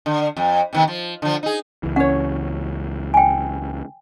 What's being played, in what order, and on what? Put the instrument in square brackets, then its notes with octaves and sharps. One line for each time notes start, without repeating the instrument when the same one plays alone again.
[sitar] D3
F2
C3 D#3 B3
F3
D3 F3
D#4 G#4
[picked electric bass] C#2 E3
[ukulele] C#4 C#5 [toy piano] F#5
[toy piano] G5 G#5